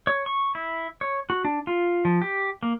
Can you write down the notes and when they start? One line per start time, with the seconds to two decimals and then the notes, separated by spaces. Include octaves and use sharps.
0.07 C#5
0.26 C#6
0.55 E4
1.01 C#5
1.30 F#4
1.45 D4
1.67 F4
2.05 F3
2.22 G4
2.63 A#3